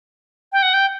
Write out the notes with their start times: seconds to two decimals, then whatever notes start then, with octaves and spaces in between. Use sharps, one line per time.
0.52 G5
0.63 F#5
0.74 G5